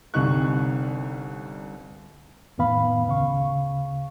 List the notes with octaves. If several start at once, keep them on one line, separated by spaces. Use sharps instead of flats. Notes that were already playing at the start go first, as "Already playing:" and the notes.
G1 C2 C3 D#4 C#6 F#6
F2 A2 D#3 B3 F5 B5
D2 C#3 F5 C#6